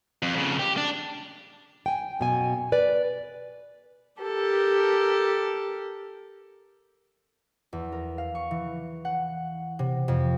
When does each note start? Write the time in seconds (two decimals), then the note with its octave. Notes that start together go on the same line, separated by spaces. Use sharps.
0.23 F2
0.36 F2 C#3
0.59 G4
0.77 D4
1.86 G5 G#5
2.19 F#2 B2 G#5
2.72 B4 D5
4.21 G4 A4 A#4
7.73 E2
7.92 A#4
8.18 F5
8.35 C#6
8.51 E3
9.05 F#5
9.79 C3
10.08 F2